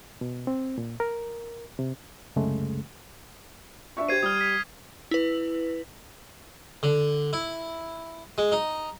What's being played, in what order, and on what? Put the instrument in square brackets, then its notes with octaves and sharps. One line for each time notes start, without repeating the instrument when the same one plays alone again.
[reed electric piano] B2
C4
A#2
A#4
C3
C2 F#2 C#3 G#3 A3
[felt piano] D4 E5 C#6
[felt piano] G4 C5 [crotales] G#6 C7 D#7
[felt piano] G3 [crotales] D#6 F6
[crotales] F6 B6
[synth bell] E4 B4
[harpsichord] D3
E4
G#3
D#4